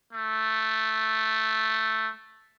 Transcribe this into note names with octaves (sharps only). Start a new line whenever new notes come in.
A3